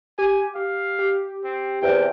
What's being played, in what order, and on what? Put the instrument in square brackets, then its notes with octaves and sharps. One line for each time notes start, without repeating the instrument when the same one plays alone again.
[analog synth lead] G4 [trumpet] G#5
[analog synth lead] G4 [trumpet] F5
[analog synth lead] G4
[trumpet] C4
[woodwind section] E2 C3 [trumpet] G5